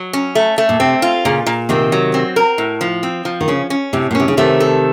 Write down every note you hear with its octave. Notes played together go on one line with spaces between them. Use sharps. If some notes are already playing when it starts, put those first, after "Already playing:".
Already playing: F#3
C#4
A3
A3
A#2
C3 C4
F4
A#2 C#3
A#2
C3 D#3 C4
F#3
C4
A#4
A2
F3
C4
F3
D#3
C#3 C#4
C#4
A2 C3
A#2
C3 C#4
C#3
C3 D#3 A3
A4